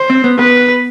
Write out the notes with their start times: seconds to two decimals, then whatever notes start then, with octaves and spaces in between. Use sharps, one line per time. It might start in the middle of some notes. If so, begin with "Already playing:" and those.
Already playing: C5
0.10 C4
0.24 B3
0.39 B3 B4